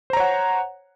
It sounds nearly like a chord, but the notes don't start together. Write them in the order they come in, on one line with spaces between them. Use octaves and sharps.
C5 A#5 C#5 F#5